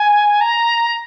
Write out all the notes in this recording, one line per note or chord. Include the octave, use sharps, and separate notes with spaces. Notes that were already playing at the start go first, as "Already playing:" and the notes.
Already playing: G#5
A#5